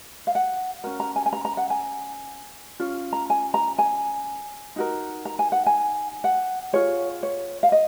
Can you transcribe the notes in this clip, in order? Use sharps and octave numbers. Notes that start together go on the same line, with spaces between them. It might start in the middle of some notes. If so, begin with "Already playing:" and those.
F5
F#5
C#4 F#4 A#4
A#5
G#5
G#5
A#5
A#5
F#5
G#5
C#4 F4
A#5
G#5
A#5
G#5
D#4 F#4 A#4
A#5
G#5
F#5
G#5
F#5
F4 G#4 C#5
C#5
F5
D#5